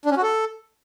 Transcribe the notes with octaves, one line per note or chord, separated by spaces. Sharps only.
D4
C#4
F#4
A4